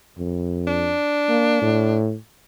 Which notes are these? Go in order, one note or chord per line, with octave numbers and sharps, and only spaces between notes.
F2
D4
A#3
A2